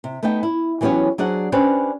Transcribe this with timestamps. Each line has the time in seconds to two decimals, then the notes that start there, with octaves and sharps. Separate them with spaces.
0.04 C3
0.23 A3 B3 D#4 G5
0.43 E4
0.81 E3 F#3 B3 C#4 G4 C#5
1.18 F#3 D4 G#4 C5 D5 F#5
1.52 C#4 D4 G4 B4 C5 D5